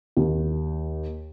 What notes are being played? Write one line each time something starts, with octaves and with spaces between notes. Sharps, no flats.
D#2